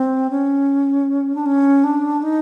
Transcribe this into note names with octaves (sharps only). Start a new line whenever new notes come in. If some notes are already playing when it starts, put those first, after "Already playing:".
Already playing: C4
C#4
D4
C#4
D4
D#4